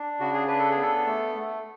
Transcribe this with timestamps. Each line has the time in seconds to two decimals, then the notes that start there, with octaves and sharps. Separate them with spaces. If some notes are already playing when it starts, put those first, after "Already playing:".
Already playing: D4
0.20 C#3 F#4
0.34 G#4
0.48 D4 B4
0.59 A4
0.70 G#4
0.76 B3
0.82 A4
1.06 A3
1.35 A3